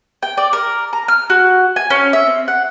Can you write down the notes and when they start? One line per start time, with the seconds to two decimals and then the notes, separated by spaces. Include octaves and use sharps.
0.23 G5
0.37 D5
0.53 A#4
0.93 A#5
1.08 F6
1.30 F#4
1.76 G#5
1.90 C#4
2.13 E5
2.27 C4
2.48 F#5